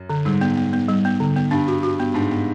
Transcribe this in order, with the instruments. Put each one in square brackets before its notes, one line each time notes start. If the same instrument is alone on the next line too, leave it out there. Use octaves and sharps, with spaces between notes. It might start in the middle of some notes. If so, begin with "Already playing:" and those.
Already playing: [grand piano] F#2
[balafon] D3
[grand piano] G#2 [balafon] G3
[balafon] B3
B3
B3
G3
B3
D3
B3
[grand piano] G2 [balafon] D4
[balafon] F#4
F#4
B3
[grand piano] G#2 [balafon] D4
[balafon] B3